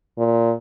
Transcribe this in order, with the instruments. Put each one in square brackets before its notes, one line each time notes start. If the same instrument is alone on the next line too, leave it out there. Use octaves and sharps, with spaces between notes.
[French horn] A#2